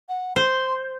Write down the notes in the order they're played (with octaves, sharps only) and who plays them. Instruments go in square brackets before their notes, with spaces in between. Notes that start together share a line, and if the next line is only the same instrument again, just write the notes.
[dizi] F#5
[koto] C5 [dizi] C6